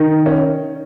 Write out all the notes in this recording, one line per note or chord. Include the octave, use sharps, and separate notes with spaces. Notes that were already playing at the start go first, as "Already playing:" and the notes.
Already playing: D#3 D#4
C#4